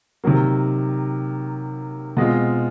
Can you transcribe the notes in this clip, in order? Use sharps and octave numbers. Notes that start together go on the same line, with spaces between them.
C3 D#3 F#3 A#3
B2 G#3 C4 F4